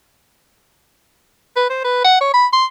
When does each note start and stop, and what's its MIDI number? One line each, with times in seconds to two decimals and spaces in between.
1.56 1.67 71
1.70 1.82 72
1.84 2.02 71
2.05 2.18 78
2.21 2.30 73
2.34 2.47 83
2.53 2.65 84